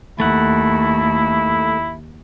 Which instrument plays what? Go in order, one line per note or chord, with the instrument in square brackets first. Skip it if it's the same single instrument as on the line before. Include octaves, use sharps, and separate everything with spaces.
[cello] D#2 [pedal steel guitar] A3 F#5 [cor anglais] E4